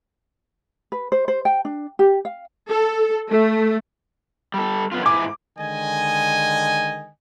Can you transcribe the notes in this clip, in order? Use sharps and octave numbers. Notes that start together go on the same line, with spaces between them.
B4
C5
C5
G5
D4
G4
F5
A4
A3
G3 A4
F#2 B3 F4
G#2 E4 G#5 D6
D3 D#3 G#3 D#5 G#5